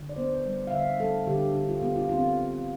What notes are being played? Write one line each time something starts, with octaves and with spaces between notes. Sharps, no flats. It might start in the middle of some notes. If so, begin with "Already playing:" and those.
Already playing: D3
D5
B3 C5
G3
F5
D3 E5
G3 A4
D3 G4
D3
F4
B3 G4
F4
C4 F4